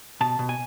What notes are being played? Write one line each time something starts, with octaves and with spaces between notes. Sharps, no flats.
B2 A5
B2
G#5